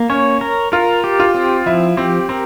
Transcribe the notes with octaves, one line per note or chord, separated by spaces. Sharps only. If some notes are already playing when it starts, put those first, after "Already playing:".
Already playing: A#3
C#4 C#5
A#4
F4 A#4
G4
F4
C4
F3 E4
C4 G4
C4 A#4